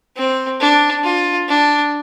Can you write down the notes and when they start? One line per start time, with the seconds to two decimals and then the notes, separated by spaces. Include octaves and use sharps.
0.17 C4
0.61 D4
1.04 F4
1.49 D4